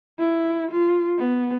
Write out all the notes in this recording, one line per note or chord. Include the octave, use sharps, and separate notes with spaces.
E4
F4
B3